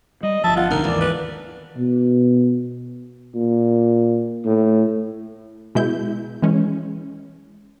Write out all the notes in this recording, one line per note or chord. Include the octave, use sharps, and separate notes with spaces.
G3 D#5
G1 F3 E5 A5
F4 F#5
C2 D3 D#4 A#4
D#2 G#2 E3 D5
B4
B2
A#2
A2
B2 G#3 E4 G6
E3 G#3 C#4